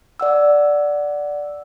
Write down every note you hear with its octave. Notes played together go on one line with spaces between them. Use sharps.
D5 F#5 E6